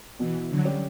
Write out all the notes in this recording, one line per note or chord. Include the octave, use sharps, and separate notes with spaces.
B2 E3
D3 F#3
G3 C#4 G4